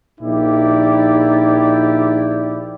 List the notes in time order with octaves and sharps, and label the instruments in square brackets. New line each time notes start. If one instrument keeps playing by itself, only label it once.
[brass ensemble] A#1 D#4 E4 G4 D5